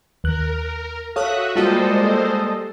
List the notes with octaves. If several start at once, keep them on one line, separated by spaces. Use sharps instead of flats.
D#2 A#4 F#6
F#4 A4 C#5 E5 F5 D#6 F#6
G3 G#3 A#3 F4 F#4 A4 C5 D#5